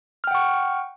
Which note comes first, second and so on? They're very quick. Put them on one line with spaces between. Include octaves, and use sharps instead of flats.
F6 G5 F#5 C#6